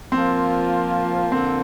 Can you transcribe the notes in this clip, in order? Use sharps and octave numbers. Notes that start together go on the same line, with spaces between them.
F3 A#3 C4 F4
D3 F3 A#3 C4